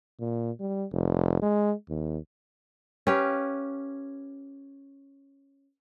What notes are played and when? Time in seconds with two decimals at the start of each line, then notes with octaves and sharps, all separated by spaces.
0.20 A#2
0.60 G3
0.92 F1
1.42 G#3
1.89 D#2
3.07 C#4 G4 B4 F5